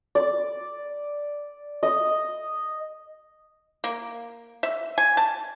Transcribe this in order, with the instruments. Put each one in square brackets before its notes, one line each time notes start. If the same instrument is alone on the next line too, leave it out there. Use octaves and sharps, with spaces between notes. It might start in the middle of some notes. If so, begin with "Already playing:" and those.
[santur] D5
D#5
[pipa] A#3
E5
G#5
A5